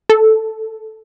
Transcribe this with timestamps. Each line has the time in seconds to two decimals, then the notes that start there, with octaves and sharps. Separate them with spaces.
0.09 A4